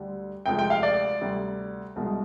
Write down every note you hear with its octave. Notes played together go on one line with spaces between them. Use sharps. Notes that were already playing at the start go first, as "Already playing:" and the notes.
Already playing: D2 D3 G3
D2 C3 F3 G#3 G5
G5
F5
D5
D2 C3 G3
C2 B2 G#3